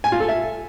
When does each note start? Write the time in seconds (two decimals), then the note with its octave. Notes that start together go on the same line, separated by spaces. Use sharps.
0.04 G#5
0.12 F4
0.20 A4
0.29 E5